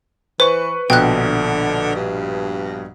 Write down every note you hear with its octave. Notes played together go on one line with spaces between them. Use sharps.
E3 B4 C5 C#6
A#1 B2 D3 G5 F#6
G2